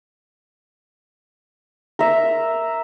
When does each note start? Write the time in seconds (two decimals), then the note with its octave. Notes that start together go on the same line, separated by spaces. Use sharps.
1.99 A#4 E5